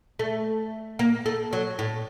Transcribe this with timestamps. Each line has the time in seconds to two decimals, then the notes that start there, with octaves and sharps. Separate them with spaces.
0.19 A3
0.99 A#3
1.26 A3
1.53 F#3
1.79 A2